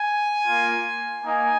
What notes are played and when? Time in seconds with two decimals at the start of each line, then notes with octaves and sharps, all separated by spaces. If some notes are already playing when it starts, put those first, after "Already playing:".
Already playing: G#5
0.48 A#3 F4
1.23 A#3 D#4 G#5